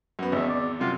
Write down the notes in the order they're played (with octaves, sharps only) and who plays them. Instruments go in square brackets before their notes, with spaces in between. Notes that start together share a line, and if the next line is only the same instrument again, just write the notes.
[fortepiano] F#2 B3
[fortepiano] G#1 E2 [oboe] E5
[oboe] D5
[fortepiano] F#2 C3 [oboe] F4